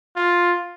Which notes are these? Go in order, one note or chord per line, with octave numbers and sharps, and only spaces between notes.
F4